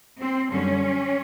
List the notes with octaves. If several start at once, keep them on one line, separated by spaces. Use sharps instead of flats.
C4
F#2 D3 G3 C#4